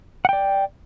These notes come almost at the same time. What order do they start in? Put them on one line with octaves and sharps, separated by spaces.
F#5 G5 D5